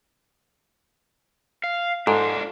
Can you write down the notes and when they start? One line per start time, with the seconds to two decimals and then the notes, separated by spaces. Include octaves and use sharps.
1.64 F5
2.07 G#2 D4 F4 A4